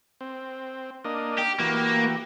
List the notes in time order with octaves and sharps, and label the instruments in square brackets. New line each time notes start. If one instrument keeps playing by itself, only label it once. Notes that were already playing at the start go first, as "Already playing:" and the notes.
[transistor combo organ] C4
A#3 D4 D#5
[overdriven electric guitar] G4
[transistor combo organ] E3 F#4 G4 [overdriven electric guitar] A#3